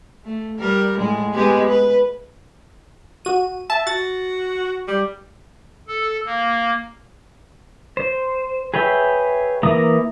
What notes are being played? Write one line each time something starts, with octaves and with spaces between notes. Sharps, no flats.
A3
G3 A#4
A2 G#3
G#3 B3 G4
B4
F#4 D#7
E5 A5
F#4 A6
G3
A4
A#3
C5
G#4 B4 C#5 E5 G5
E3 A#3 E4 A#5 D#6